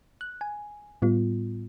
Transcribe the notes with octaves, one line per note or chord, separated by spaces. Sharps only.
F#6
G#5
A2 G3 B3 F4